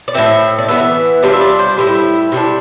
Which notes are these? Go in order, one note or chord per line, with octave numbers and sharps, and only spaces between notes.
D5
A2 F3 C4 E5
D5
E3 G3 B3 E5
C3 G3 D4 F4 D5
E5
D5
C5
A2 G3 C4 E4
C3 G3 D4